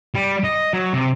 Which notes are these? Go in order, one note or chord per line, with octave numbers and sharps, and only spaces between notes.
G3
D#5
F#3
C3